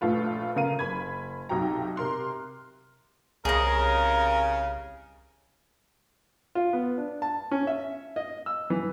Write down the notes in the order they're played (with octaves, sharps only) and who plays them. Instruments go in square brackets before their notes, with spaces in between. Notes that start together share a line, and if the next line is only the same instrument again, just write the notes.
[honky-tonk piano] A#1 A3 F4 B4
C#3 A#4 F5 D#7
F#1 B5 G#6
B1 C3 D#4 F#4 G5 A#5
C3 A#4 C6 F#6
[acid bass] C2 [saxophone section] C#3 [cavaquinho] G#4 D#5 [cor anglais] A#4
[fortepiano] F4
B3
D4
A5
C#4
E5
D#5
E6
E3